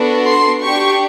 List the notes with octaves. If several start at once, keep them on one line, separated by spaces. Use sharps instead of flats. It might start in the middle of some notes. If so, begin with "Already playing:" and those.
Already playing: B3 D4 F#4 A4
C6
D4 G4 C#6